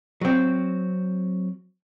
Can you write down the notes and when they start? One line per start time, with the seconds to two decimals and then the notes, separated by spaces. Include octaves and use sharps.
0.21 F#3 C4